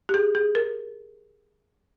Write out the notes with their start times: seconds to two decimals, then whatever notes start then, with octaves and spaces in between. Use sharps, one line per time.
0.09 G4
0.14 G#4
0.35 G#4
0.55 A#4